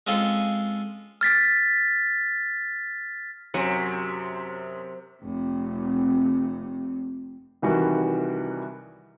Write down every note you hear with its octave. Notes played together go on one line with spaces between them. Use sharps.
G#3 C4 C#4 F4 A4
F6 A6 B6
F#2 C3 F#3 G#5 C#7
F1 C3
C2 D#3 E3 G3 F#4